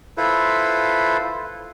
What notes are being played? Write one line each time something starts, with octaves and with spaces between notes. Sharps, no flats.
E4 F4 A4 B4 C5